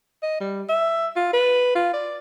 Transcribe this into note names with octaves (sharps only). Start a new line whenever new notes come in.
D#5
G3
E5
F4
B4
F4
D5